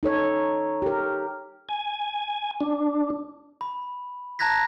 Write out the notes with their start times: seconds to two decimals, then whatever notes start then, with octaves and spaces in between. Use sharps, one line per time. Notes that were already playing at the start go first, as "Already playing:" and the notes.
0.03 D#4 A4 C#5
0.82 G4 A#4
1.69 G#5
2.61 D4
3.61 B5
4.39 A5 A#5 F#6 G#6 A#6 B6